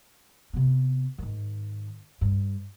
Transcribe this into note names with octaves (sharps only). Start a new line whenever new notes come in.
C3 B3
G#2 D#3
G2